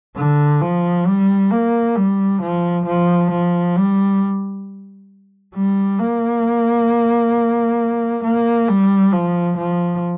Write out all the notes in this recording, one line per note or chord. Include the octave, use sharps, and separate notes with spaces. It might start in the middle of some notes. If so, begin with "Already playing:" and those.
D3
F3
G3
A#3
G3
F3
F3
F3
G3
G3
A#3
A#3
G3
F3
F3